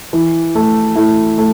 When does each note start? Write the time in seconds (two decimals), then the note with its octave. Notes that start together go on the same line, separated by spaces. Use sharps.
0.13 E3
0.55 A3
0.95 A3 E4
1.38 A3